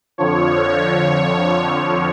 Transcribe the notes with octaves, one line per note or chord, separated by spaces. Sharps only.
F2 D3 F3 C#5
C#5
F2 D3 F3